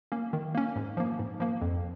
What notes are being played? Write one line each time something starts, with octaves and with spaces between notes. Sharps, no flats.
A#3 C#4
D#3
A#3 C#4
G#2
F3 A#3
G#2
F3 A#3
F2